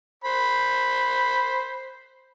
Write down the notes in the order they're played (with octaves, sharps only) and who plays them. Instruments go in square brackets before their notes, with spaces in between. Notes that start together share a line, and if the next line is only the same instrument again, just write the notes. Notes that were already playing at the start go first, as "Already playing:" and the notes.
[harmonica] C5 B5